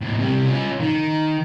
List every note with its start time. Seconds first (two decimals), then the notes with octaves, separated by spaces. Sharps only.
0.01 D#2 A2
0.19 C3 G3
0.45 C#4 F4
0.80 D#3